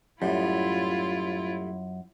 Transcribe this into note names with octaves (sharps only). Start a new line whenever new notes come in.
F#2 A2 G3 E4 F4